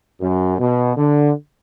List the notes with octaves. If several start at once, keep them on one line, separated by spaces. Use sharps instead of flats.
F#2
B2
D3